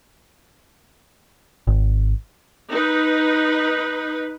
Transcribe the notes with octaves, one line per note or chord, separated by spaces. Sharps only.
G#1
D#4 B4